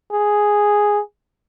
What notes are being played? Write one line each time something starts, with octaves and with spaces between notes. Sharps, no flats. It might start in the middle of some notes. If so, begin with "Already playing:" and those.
G#4